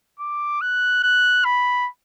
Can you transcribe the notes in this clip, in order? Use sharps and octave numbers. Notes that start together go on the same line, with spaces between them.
D6
F#6
F#6
B5